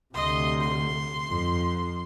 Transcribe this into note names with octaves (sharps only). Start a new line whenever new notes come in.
D2 C3 D#5 C6
C6
F2